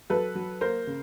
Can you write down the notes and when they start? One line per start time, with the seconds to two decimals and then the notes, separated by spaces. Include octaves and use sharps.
0.10 F#3 A4 B4
0.35 F#3
0.61 A#3 A#4 C5
0.87 C#3